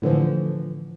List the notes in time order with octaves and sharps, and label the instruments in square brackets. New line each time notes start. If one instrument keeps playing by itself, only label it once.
[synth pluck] A2 D3 E3 F3